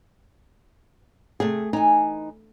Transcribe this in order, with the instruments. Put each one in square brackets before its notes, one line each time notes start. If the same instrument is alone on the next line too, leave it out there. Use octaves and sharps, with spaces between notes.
[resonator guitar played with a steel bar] C3 [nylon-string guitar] A3 G#4
[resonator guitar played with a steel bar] E3 G#5 [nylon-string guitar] D#4